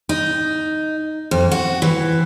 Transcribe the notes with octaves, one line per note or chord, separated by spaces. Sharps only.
D#4
F2
F#4
E3